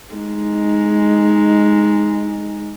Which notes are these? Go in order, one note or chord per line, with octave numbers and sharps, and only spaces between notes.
G#3 D#4